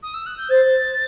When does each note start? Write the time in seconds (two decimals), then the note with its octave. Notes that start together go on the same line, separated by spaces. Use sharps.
0.03 D#6
0.14 E6
0.26 F#6
0.38 G6
0.50 C5 A6